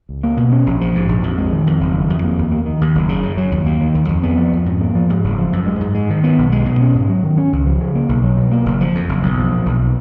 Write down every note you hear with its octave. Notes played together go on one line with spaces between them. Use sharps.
C#2
A#3
B2
C#4
A#1
F3
G#2
A#1
F2
G#3
D#3
F2
F#1
D#3
F2
A#3
D#2
A#3
D#3
D#2
F#1
C#3
F#2
F#3
D#2
A#3
D#3
D#2
F2
B3
F3
F2
G#2
A#3
F3
G#2
F#1
F3
F#2
G#3
G#2
G#3
D#3
B3
B1
G#3
B2
C#4
G#2
F#3
D#3
C#4
C#2
F3
C#3
A#3
B1
F#3
B2
A#3
F#1
F3
F2
F#1
B1
F3
A#2
B1